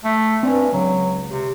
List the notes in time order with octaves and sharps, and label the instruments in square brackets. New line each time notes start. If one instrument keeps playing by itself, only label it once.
[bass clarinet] A3
[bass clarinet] G2 [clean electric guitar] C4 D5 G#5
[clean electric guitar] C#2 [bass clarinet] F#3
[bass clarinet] C3